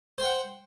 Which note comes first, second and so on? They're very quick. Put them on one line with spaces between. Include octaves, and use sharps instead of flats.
C5 G5 F#5